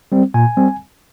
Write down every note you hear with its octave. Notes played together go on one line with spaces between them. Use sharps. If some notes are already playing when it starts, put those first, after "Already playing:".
G3 C4
A#2 G#5
G3 C4